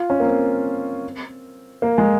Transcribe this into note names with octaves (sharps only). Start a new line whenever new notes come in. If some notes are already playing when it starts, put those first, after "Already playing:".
Already playing: F4
C#4
A#3
C4
A#3
G#3